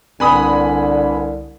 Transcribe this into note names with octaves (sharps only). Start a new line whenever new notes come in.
C2 D3 C4 B4 G#5 B5 D#6